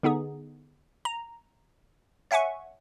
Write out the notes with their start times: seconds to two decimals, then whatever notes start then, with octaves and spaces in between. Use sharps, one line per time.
0.03 D3 B3 D#4 G#4
1.05 A#5
2.31 C#5 E5 F#5 G#5 C#6